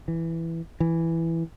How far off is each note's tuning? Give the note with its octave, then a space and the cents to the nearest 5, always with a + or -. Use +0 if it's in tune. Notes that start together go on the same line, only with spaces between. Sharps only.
E3 +5
E3 +5